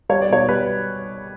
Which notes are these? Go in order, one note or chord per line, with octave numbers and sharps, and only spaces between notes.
G3 C#5
D5
B2 C#5
G3 B4